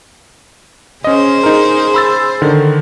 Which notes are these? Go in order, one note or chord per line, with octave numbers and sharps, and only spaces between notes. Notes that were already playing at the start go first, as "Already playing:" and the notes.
C#3 C#4 G#4 C5 D#5
D#4 A#4
B5 E6 A6
D3 D#3